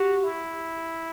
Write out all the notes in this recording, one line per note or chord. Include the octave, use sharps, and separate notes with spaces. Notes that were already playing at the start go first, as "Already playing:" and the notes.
Already playing: F#4 G4
E4